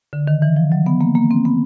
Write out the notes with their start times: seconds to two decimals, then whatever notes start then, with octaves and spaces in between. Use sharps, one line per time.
0.13 D3
0.27 D#3
0.42 E3
0.56 F3
0.72 F#3
0.86 B3
1.01 A#3
1.15 A#3
1.31 C4
1.45 B3